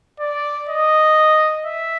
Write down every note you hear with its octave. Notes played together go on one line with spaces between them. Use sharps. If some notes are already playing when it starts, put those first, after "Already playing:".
D5
D#5
E5